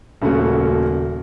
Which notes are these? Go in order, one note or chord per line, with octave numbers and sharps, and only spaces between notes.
D#1 C#3 A3 F#4